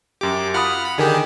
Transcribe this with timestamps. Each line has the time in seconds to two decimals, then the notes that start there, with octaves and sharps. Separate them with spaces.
0.21 F#2 G4 D6
0.54 F4 F#5 B5 D#6 F6
0.85 B5
0.98 D3 D#3 G4 G#4 A#4 G#5